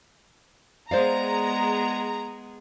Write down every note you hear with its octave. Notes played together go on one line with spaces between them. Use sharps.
G#3 B3 G#4 C5 D5 F5 A#5